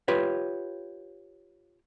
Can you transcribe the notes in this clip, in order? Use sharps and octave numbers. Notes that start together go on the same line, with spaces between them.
F4 G4 B4 C#5